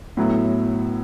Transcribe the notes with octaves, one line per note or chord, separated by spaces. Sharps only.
A2 F#3 B3 E4